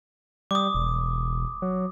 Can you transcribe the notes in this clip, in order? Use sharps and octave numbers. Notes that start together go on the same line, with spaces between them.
G3 D6 D#6
E1
F#3